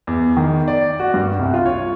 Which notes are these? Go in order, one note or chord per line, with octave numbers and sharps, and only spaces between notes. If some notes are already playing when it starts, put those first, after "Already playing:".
E2
D#3
D5
F#4
G2
C2
F4
C#5